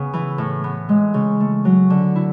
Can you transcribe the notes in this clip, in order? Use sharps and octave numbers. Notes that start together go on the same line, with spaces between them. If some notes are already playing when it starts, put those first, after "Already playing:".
Already playing: C#3 B3
E3
A2
B3
G#3
C#3
A3
F#3
D3
E4